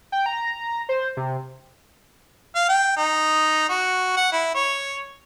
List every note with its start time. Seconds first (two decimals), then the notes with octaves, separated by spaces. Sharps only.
0.12 G5
0.26 A#5
0.89 C5
1.17 C3
2.55 F5
2.69 G5
2.97 D#4
3.69 F#4
4.16 F#5
4.33 E4
4.55 C#5